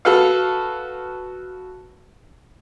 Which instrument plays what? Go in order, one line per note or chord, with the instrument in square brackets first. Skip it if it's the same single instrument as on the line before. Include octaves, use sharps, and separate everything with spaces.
[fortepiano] F#4 A4 B4 F5